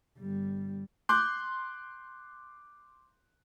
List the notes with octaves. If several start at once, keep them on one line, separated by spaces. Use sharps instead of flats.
G1 G3
C6 D6 F#6 G6